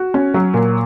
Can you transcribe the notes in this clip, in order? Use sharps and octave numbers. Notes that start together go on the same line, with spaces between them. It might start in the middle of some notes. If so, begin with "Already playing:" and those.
Already playing: F#4
C#4
F#3
A#2